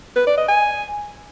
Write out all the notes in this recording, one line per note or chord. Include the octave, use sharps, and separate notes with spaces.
B4
D5
D#5
G#5